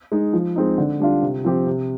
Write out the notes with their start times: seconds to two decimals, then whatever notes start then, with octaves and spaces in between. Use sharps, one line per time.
0.12 G#3 D#4
0.33 F3
0.56 G#3 C4 D#4
0.78 D3
1.00 G3 D4 F4
1.22 C3
1.45 F3 C4 G4
1.67 C3